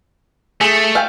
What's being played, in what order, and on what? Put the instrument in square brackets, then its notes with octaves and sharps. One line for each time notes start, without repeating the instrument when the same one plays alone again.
[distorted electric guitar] A3 [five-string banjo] G#4
[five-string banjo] F5 G5 G#5